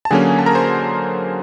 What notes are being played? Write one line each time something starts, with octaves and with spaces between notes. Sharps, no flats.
A5
D3 F#3 A#3 C#4 G#4 G#5
A5
A#4 A#5
C5 C6